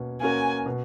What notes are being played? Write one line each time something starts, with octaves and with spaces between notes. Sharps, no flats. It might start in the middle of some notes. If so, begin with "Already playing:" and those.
Already playing: B2 A#3 C#4
A#3 C#4 F#4 A#4 G#5
B2